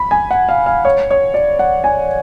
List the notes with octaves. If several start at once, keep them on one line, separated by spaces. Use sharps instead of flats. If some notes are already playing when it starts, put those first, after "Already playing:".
Already playing: B5
G#5
F#5
F5
F5
C#5
C#5
D5
F#5
G#5